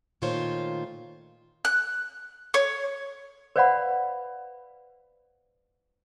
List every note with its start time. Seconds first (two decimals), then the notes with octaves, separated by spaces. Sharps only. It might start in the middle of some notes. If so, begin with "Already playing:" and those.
0.22 A#2 D#3 A3 F4 C5 C#5
1.65 F#6
2.54 C#5
3.56 B4 C5 D5 F5 F#5 B5